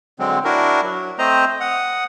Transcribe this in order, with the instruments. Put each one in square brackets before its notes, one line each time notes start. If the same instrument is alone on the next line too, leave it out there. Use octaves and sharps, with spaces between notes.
[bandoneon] D3 F#3 G#3 C4
D4 E4 F#4 A#4
F#3
A3 C4 C5 D#5 A#5
F#5 D#6